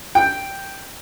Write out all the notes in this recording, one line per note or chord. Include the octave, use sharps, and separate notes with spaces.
G5